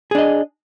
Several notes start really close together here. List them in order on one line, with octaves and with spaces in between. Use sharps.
G#4 D4 D#5